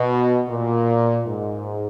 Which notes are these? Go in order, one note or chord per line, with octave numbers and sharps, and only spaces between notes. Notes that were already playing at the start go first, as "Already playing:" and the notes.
Already playing: B2
A#2
G#2